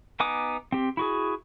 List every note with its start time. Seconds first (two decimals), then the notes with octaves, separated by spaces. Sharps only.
0.20 B3 D#4 G#5 D6 D#6
0.72 C4 G4
0.97 E4 F#4 G#4